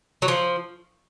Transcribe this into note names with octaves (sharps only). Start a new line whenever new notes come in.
F#3
F3